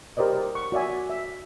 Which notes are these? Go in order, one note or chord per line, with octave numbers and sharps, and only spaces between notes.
G4 A#4 C5 D5 D#5
C#6
F#4 D5 E5 G#5
E5